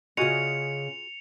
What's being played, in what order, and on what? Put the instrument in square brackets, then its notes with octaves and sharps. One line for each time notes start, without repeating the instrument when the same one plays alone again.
[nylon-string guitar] C#3 D#5 [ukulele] F4 F#4 G#4 [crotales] C#7 F7